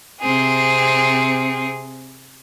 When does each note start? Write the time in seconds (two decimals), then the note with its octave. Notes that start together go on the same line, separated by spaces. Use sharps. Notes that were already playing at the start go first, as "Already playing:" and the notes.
0.21 C3 C4 G#4